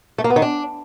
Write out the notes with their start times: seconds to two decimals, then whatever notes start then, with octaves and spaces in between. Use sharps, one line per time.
0.18 A3
0.24 A#3
0.30 B3
0.36 D#3
0.42 D4